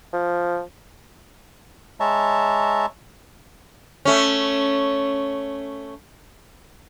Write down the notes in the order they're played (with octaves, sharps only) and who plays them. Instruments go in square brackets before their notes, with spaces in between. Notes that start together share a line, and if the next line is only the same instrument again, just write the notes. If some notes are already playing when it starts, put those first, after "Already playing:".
[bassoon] F3
[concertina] G#3 C#5 E5 A5 A#5
[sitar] A3 C#4